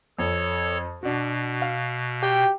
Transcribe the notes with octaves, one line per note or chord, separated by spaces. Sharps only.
F2 A4 C#5
B2 D4 F#4
F5
G4 G5